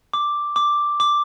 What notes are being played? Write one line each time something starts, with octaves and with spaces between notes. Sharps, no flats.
D6
D6
D6